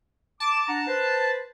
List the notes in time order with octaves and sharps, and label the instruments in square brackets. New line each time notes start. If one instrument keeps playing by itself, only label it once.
[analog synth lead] A5 [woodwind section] D6
[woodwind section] D4 F#5 A#5
B4 C5